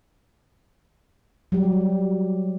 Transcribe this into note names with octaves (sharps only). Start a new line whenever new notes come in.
F#3 G3 G4